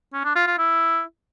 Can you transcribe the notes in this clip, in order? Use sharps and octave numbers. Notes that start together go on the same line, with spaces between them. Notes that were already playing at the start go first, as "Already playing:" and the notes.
C#4
D4
F4
F4
E4